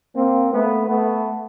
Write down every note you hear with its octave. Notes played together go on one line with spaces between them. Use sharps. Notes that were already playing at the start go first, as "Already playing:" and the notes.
A#3 C4
A3 B3
A3 B3